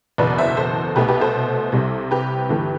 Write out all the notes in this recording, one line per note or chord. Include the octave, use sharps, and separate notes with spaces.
F#1 E2 B2 B4 D5
C5 E5
A4 C5
C2 B2 A3 G4 B4
G4 B4
A4 C5
C2 C3 G3
G4 B4
G1 G2 E3 A3